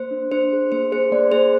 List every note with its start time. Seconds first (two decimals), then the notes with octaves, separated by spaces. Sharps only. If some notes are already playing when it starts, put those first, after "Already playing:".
Already playing: A#3 C5
0.11 D4
0.32 D4 C5
0.52 G#4
0.72 A#3 C5
0.92 G#4 C5
1.12 A#3 D5
1.32 G#4 C5